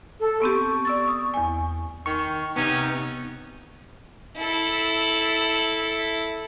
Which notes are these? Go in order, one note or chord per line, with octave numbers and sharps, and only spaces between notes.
A4
B3 C4 G4 C#6
D5 E6 A6
D#6
E2 G#5
D#3 C#6
C3 B3 C#4 D#4
E4 A4